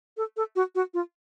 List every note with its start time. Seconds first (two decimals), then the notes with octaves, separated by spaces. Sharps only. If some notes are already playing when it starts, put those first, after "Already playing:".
0.17 A4
0.37 A4
0.56 F#4
0.75 F#4
0.94 F4